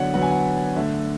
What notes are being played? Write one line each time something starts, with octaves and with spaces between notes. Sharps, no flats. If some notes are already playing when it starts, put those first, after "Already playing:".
Already playing: D3 F#3 B3 B4 C#5 D5 F#5
D3 F#3 B3 F#5
G#5
F#5
D3 A3 E5